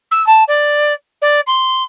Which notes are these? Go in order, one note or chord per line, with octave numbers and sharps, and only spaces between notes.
E6
A5
D5
D5
C6